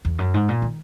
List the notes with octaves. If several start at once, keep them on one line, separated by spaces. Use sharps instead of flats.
E2
F#2
G#2
A#2
D#3